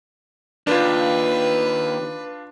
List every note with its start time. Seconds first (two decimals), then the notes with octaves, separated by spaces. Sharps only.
0.67 D#2 D4 F4 B4